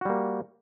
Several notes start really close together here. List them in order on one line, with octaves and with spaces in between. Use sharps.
F#4 G3 A#3